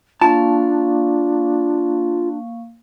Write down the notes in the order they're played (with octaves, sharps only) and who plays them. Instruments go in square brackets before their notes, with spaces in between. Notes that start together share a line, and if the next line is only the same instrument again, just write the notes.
[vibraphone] A#3 F5 C#6 [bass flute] D4 [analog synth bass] F4 [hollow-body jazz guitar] A5